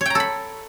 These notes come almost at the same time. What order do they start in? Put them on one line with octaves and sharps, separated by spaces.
C#5 G5 A#5 A4 B5